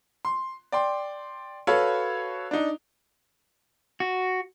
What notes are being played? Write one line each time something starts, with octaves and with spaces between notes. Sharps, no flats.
C6
D5 G5 C6
F#4 A4 B4 C#5 F5
D4 D#4
F#4